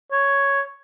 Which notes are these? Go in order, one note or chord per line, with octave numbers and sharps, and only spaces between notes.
C#5